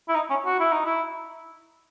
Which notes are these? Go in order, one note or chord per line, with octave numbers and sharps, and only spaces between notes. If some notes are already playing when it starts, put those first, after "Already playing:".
E4
D#4
C#4
F#4
E4
D#4
E4